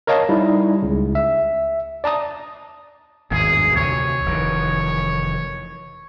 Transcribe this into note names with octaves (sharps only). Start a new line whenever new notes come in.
A#4 C#5 D#5 F5 A5
G3 D#4 E4
C#2 C#3
E5
D5 A5 A#5 D#6
G#1 E2 G2 G#4
D2 C3 E3 C#5
F1 D#3 E3